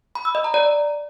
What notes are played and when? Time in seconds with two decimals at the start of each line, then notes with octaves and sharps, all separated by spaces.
0.15 B5
0.25 E6
0.35 D#5
0.44 A#5
0.54 D5